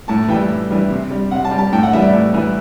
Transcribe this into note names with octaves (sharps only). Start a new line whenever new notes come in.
A2 A5
E3 G3 G5
A2
E3 G3
C3
G3
C3 F#5
A5
G3
A5
A2 G5
F#5
E3 G3 E5
D5
A2
E3 G3